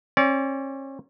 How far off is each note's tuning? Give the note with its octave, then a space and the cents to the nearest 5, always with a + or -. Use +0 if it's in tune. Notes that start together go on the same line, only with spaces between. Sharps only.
C#4 -40 D5 -35